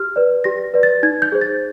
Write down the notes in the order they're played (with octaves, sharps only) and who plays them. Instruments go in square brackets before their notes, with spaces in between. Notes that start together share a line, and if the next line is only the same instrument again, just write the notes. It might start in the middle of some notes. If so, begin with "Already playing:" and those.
Already playing: [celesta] G4 F6
B4 D5
G4 A#6
B4 D5
A6
D#4 G#6
G6
G#4 C5
A6